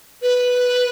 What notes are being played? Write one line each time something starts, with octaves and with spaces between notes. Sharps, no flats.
B4